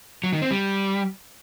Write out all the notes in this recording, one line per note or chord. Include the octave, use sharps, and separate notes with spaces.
F#3
D#3
C4
G3